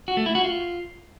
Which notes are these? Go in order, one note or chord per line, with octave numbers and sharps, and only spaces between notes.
F#4
A3
E4
F#4
F4